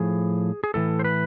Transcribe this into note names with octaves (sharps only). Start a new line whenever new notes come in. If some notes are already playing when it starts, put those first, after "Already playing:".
Already playing: A2 F3 G#4
G#4
A2 E3 A4
C5
B4